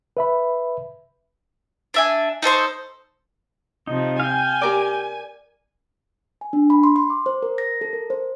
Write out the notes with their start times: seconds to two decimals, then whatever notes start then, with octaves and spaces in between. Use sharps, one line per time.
0.17 B4 E5 B5
1.94 D4 E5 G#5
2.42 D#4 A4 C5 C#6
3.87 C3 F3 D#4
4.20 F5 G5 G#5
4.61 G4 A#4 D5
6.41 G#5
6.53 D4
6.70 B5
6.84 C6
6.96 C6
7.10 D6
7.26 C5
7.43 A#4
7.58 A#6
7.81 A4
7.93 A#4
8.10 C5